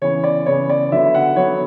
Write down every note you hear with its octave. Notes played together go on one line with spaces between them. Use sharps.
C#3 E3 B3 C#5
D5
C#3 E3 B3 C#5
D5
D3 F#3 B3 E5
F#5
D3 F#3 B3 C#5